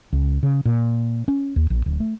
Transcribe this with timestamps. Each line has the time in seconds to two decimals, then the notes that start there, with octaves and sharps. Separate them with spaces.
0.13 C#2
0.43 C#3
0.65 A#2
1.28 C#4
1.56 D#2
1.70 A#1
1.86 D1
2.00 A3